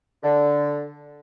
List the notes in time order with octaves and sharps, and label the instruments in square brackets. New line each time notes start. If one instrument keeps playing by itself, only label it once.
[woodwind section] D3